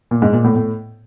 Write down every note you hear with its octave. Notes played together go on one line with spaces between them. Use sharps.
A#2
G#2
A#2
A2
A2